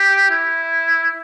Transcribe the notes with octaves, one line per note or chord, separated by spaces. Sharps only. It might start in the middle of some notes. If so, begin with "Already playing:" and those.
Already playing: G4
E4